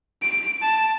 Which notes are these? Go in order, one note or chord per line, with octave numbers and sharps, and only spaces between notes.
D7
A5